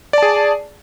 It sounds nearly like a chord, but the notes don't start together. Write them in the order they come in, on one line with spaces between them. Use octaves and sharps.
D5 A5 G#4